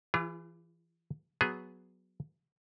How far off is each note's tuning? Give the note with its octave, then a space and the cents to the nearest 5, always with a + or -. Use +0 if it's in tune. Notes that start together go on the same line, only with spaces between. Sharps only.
E3 +20 F4 -35 G#4 -35
F#3 +0 B3 +0 G#4 +0